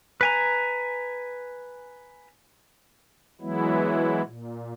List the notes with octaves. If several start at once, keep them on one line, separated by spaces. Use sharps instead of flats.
B4 G#5 A#5
E3 F#3 G#3 B3 E4
A#2